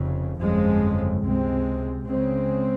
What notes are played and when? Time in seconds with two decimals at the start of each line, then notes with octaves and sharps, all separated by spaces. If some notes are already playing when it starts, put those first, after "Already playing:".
Already playing: F1 F2 C#3
0.38 G1 F2 C#3 F3 G#3
1.23 C#2 C3 G#3 C4
2.07 C#2 C#3 G#3 C4